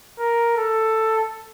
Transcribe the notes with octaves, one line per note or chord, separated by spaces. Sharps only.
A#4
A4